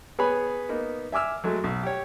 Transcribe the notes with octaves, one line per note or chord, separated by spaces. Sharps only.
B3 G#4 B4 C#5 G#5 B5
A#3 B3 D#4
E5 G#5 D6 E6 F6
F#3 G#3 A3
B1
G4 C#5